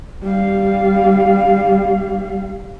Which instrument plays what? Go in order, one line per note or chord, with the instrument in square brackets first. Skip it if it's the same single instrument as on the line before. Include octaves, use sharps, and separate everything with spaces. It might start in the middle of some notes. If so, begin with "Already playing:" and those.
[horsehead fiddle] G3 F5